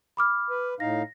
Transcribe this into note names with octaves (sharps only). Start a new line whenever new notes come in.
B5 D6 F6
B4
A2 D#4 F5 A#6